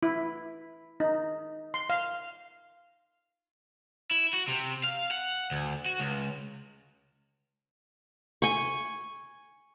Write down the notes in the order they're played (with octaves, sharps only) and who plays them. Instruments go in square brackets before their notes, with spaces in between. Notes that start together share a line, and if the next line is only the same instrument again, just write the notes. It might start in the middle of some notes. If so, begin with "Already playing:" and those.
[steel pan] E4
D#4
C6
F5
[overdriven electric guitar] E4
F#4
C3
F5
F#5
D2
F#4
C#2
[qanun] G#5 C#6